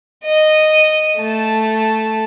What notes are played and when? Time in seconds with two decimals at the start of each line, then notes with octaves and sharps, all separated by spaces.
0.24 D#5
1.17 A3 A5